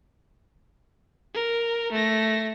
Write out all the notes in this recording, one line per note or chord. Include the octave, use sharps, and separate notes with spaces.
A#4
A3 A#6